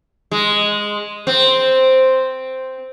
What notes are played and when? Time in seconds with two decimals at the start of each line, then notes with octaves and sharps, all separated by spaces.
0.32 G#3
1.27 C4